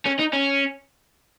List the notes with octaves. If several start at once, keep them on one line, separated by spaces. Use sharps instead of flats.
C#4
D#4
C#4